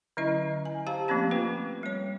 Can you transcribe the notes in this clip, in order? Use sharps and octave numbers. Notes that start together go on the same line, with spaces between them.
D3 F#3 C#4 E4 D#5 A#5
G#5
G4 C5 F5 A5 A#5
F3 A3 A#3 C4 C#4 G4
F4 B4 G5
G3 C#5